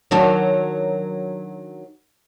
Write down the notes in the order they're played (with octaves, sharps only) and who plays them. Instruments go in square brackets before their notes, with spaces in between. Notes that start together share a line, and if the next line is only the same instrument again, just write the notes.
[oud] D#3 F#3 D4